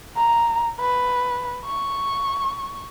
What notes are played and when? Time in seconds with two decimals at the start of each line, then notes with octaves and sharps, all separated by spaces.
0.17 A#5
0.80 B4
1.66 C#6